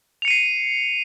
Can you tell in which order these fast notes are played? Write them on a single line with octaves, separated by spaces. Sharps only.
F7 C#7 D#7 C7